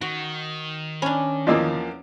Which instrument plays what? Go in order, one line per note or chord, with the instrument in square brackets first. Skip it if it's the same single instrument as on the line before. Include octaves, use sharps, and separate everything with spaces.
[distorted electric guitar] D#3 [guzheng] F#4
[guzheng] C#4 D4 [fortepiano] B5
[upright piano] E2 F3 A#3 [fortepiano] F4 D#5 E6